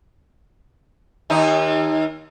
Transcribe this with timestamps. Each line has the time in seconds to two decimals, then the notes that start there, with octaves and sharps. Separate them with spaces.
1.30 D#2 D#4